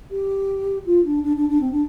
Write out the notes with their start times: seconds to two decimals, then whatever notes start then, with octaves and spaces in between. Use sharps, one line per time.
0.11 G4
0.86 F4
1.05 D4
1.24 D4
1.37 D4
1.49 D4
1.61 C4
1.72 D4